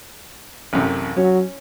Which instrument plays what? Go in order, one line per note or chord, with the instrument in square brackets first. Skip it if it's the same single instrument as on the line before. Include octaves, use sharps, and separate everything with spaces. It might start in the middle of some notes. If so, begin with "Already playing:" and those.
[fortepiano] A1 F#2 C3
[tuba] F#3 [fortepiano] C#4